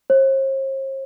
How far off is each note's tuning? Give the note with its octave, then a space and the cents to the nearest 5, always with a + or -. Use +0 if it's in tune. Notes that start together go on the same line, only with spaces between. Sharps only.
C5 +45